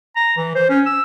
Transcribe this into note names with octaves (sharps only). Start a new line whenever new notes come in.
A#5
E3
C5
C#4
E6